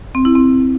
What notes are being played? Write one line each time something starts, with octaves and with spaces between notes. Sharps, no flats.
C4
E4
C4